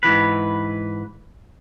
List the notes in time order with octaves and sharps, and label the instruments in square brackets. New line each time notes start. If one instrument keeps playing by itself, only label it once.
[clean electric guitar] G#2 B2 E3 B4